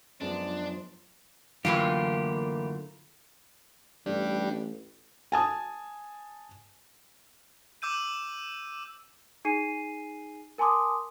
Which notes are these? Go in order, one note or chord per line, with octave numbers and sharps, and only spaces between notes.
F#2 F3 F#3 G#3 B3 D4 F4
F#2 A2 D3 E3 F#3 A#3 F4 G4
A1 G3 D4
G#5 A5 D#6
D6 E6 G6 D#7
D#4 G#4 G#5 C7 D#7
A#4 G#5 A5 C6 D6 D#6